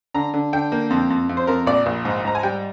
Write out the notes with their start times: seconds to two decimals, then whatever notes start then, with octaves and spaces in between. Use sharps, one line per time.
0.14 D3 A#5
0.34 D3
0.53 D3 G5
0.72 A#3
0.90 F2
1.10 F2
1.29 F2
1.37 C5
1.47 F2 A#4
1.66 A#1 D5
1.86 A#1
2.05 G#2
2.24 G#2 A#5
2.35 G#5
2.43 G3 G5